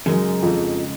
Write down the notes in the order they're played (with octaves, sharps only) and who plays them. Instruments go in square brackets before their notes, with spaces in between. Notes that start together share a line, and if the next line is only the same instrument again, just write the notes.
[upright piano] F#2 [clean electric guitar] C#3 G#3 D#4
[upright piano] F2